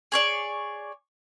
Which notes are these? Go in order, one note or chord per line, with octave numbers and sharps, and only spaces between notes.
G#4 C#5 D5